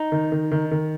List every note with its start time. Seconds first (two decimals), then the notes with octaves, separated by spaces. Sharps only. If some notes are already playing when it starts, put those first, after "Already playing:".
Already playing: D#4
0.12 D#3
0.32 D#3
0.52 D#3
0.71 D#3